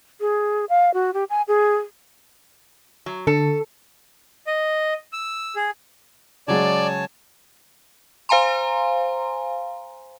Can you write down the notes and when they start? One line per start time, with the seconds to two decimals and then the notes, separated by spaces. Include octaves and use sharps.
0.21 G#4
0.69 F5
0.94 F#4
1.14 G4
1.30 G#5
1.48 G#4
3.06 F#3
3.27 D3 A4
4.47 D#5
5.13 E6
5.56 G#4
6.48 C#3 F#3 G#3 C#5 D5 G#5 A5
8.29 C5 F5 G#5 A#5 C6